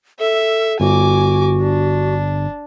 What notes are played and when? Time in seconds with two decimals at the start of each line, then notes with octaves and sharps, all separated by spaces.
0.19 A4 E5
0.80 G1 F#4 G#5 D6
1.62 D4